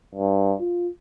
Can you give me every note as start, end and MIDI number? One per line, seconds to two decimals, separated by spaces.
0.15 0.55 43
0.60 0.88 65